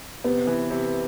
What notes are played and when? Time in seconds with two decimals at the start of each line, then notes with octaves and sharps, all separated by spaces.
0.24 C3 B3
0.47 E3
0.71 C3